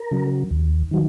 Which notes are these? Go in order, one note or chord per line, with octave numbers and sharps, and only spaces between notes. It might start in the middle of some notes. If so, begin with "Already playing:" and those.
Already playing: A#4
C#3 F#3
D#2
D#3 F#3